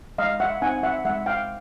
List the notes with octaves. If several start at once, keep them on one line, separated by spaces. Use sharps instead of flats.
G#3 D#5 F5
E5 F#5
C4 D#4 F#5 G#5
E5 F#5
G#3 E5 F#5
F5 G5